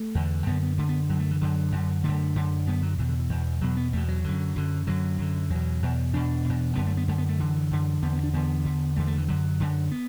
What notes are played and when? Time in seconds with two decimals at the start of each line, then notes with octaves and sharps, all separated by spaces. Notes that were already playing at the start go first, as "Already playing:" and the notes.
Already playing: A3
0.15 E2 D3
0.46 F#2 D3 B3
0.62 B3
0.78 F#2 D3 A3
0.89 B3
1.09 F#2 D3 F#3
1.20 A3
1.31 E3
1.41 F#2 D3 F#3
1.72 F#2 D3
2.04 F#2 D3 A3
2.35 F#2 D3
2.67 F#2 D3 B3
2.83 F#3
2.98 E2 B2 E3
3.09 D3
3.19 E3
3.29 E2 B2
3.61 E2 B2 F#3
3.77 B3
3.93 E2 B2 A3
4.08 F#3
4.24 F#2 D3
4.56 F#2 D3
4.87 F#2 D3 F#3
5.18 F#2 D3
5.50 E2 B2 F#3
5.82 E2 B2
6.13 E2 B2 D4
6.45 E2 B2
6.76 F#2 D3 B3
6.87 A3
6.97 B3
7.08 F#2 D3 A3
7.18 B3
7.29 A3
7.39 F#2 D3 E3
7.71 F#2 D3
8.02 E2 D3 B3
8.13 B3
8.23 D4
8.33 E2 D3 B3
8.65 E2 D3
8.96 E2 D3 A3
9.07 A3
9.18 E3
9.28 F#2 D3 F#3
9.60 F#2 D3
9.91 B3